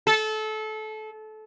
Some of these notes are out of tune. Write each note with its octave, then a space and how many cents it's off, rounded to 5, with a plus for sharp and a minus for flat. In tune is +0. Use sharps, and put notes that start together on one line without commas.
A4 -25